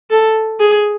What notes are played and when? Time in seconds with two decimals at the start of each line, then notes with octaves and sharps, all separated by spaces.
0.11 A4
0.60 G#4